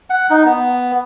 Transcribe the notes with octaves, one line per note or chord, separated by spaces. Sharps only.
F#5
D#4
B3